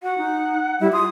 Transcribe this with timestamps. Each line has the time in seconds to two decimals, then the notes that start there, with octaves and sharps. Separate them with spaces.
0.03 F#4 F#5
0.18 D#4
0.80 G3 E4
0.92 F4 D#6